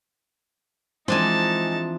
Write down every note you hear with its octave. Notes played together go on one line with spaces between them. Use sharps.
E3 F3 G#3 C4 D4 D#4 G#5 A5